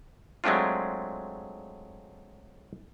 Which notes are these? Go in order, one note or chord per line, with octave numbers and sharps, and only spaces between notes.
F#3 G#3 A3 C4 D4 F4